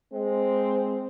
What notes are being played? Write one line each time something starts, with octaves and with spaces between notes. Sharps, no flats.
G#3 C4